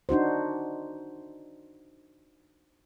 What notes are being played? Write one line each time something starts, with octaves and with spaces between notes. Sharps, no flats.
D4 D#4 F#4 C5